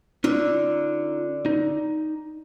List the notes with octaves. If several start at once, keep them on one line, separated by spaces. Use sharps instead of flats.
D3 C#4 D#4 F4
D#4